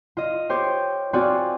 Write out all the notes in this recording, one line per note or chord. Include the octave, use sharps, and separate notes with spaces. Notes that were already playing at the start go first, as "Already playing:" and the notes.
F4 D#5
G4 C5 C#5
C4 F4 F#4 G#4 C5 D5